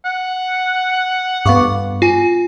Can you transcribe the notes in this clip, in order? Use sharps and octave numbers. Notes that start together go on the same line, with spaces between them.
F#5
G2 B3 F5 C#6 D6
F4 G#5